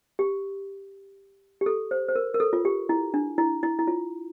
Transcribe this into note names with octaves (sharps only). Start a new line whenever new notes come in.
G4
G4
A4
C5
C5
A#4
A#4
A4
F4
G4
E4
D4
E4
E4
E4
F4